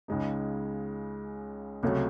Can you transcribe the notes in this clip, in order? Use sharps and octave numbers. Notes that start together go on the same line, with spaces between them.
C#2 C#3 G#3 D#4
C#2 C3 F#3 A3 C#4